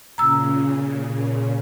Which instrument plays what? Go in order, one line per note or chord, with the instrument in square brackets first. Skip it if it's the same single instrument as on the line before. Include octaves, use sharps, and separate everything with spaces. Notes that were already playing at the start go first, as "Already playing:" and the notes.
[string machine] A#2 C#3 [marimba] A#5 E6